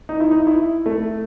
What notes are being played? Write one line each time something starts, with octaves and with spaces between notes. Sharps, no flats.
D#4
E4
D#4
E4
A3